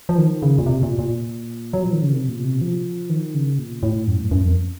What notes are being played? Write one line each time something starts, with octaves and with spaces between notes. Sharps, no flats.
F3
D#3
C#3
A#2
C3
A#2
A#2
F#3
F3
D#3
C#3
C3
A#2
C3
F3
D#3
C#3
A#2
A2
F#2
A2
F#2
F2